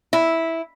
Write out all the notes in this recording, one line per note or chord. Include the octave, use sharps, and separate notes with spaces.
E4